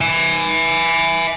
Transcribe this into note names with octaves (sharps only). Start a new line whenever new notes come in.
E5 G#5